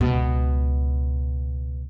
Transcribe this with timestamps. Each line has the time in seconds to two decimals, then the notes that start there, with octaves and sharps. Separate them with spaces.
0.01 C#2 B2